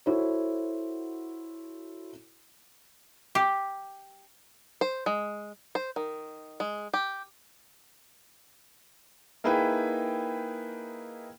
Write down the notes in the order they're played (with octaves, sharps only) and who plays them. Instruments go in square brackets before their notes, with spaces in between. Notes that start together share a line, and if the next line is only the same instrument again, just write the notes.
[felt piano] E4 F#4 A4 C5 C#5
[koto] G4
[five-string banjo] C5
G#3
C5
D#3
G#3
G4
[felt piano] A#3 D#4 E4 G#4 B4 G5